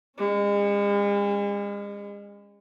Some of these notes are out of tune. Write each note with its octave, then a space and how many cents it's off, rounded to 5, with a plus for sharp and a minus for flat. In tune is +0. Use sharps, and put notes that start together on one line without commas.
G#3 -40 C#4 -5